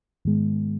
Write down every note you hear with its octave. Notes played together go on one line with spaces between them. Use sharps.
G#2 D#3 G#3 B3